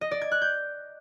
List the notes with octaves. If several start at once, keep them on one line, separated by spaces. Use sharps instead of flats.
D#5
D5
G#6
F#6
G6